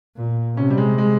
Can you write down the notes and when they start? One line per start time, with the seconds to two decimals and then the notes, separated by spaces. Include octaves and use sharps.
0.16 A#2
0.57 C3 C#4
0.70 G3
0.78 G#3
0.98 G#3